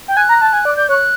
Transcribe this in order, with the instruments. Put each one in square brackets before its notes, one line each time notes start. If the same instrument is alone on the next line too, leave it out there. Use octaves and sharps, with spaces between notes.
[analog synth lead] G5
[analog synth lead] G#5 [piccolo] F#6
[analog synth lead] A#5
A5
G#5
D5
[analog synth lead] D5 [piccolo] G6
[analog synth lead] C#5 [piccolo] F#6